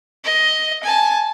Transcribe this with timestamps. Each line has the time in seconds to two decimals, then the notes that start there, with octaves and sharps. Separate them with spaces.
0.24 D#5
0.83 G#5 A5